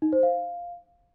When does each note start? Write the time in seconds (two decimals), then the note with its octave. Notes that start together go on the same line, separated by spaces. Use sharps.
0.02 D#4
0.13 C5
0.23 F5